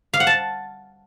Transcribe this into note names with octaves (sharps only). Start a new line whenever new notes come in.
F5
F#5
A5